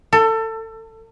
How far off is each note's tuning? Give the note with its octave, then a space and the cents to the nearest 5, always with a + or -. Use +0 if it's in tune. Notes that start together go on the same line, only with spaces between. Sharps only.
A4 +25